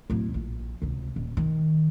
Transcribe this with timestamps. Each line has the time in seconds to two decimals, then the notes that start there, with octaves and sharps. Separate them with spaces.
0.10 D1 E4
0.34 A#1
0.82 C#2 C3
1.16 D#1
1.37 D#3